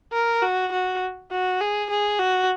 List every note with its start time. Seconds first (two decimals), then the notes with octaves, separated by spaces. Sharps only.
0.13 A#4
0.42 F#4
0.72 F#4
1.31 F#4
1.60 G#4
1.90 G#4
2.19 F#4